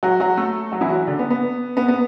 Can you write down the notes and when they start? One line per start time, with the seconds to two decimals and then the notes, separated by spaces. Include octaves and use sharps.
0.03 F#3 F#4
0.20 F#3 F#4
0.37 A3 A4
0.72 F#3 F#4
0.81 E3 E4
0.89 F#3 F#4
1.07 D3 D4
1.19 B3
1.30 B3
1.77 B3
1.88 B3